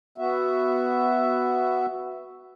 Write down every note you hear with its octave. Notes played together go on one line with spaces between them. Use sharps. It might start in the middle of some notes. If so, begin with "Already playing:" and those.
B3 F#4 E5